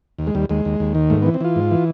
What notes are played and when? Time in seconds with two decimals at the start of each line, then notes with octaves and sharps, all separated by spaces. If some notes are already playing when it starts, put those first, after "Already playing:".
0.19 D#2
0.27 G#3
0.35 D#2 G3
0.49 D#2 G#3
0.65 D#2
0.80 D#2
0.95 D#3
1.10 G#2 A3
1.22 B3
1.26 E3
1.34 C4
1.41 E3 F4
1.56 G#2
1.71 E3